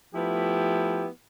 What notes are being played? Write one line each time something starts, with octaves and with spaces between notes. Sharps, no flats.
F3 A3 B3 E4 G4